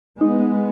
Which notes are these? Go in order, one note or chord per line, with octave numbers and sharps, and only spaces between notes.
G#3 B3 D#4